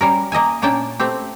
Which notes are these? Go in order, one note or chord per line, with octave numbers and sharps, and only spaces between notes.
G3 C#4 A#4
A#3 D#5 E5 G#5
A#2 A#3 C#4 D4 G5 A5
A3 C4 G4